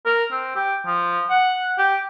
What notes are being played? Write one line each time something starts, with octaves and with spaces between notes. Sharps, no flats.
A#4
C4
G4
F3
F#5
G4